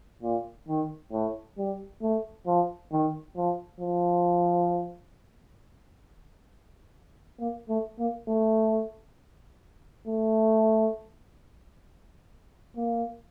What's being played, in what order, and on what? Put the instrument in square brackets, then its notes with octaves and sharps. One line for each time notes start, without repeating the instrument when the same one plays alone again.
[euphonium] A#2
D#3
A2
G3
A3
F3
D#3
F3
F3
A#3
A3
A#3
A3
A3
A#3